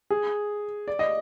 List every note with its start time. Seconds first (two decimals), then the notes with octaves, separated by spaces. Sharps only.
0.10 G#4
0.88 D5
0.99 D#5